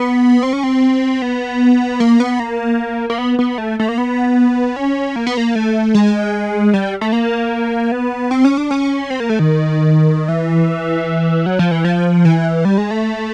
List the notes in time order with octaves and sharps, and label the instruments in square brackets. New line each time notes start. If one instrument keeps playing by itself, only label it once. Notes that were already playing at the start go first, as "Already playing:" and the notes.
Already playing: [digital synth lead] B3
C4
C#4
C4
B3
A#3
B3
A#3
A#3
B3
B3
A3
A3
A#3
B3
C#4
A#3
B3
A#3
A3
G#3
G3
A3
A#3
B3
C4
C#4
D4
C#4
C4
A#3
A3
D#3
E3
F#3
F3
E3
F3
E3
G3
G#3
A3